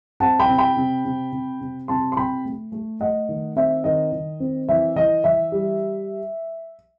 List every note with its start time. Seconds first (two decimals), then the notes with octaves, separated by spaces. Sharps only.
0.20 C4 F#5 A5
0.40 G5 B5
0.49 C3
0.58 G5 B5
0.77 C3
1.05 C3
1.32 C3
1.61 C3
1.88 C3 A5 C6
2.12 C6
2.17 C3 G5 B5
2.45 A3
2.72 A3
3.00 A3 D#5 F#5
3.29 D#3
3.56 C4 E5
3.84 D#3 D#5
4.12 D#3
4.40 C4
4.69 E3 E5
4.96 E3 D#5
5.24 E3 E5
5.52 G3